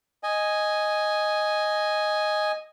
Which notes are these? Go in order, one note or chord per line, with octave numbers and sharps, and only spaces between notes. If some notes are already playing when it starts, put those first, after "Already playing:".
D#5 G#5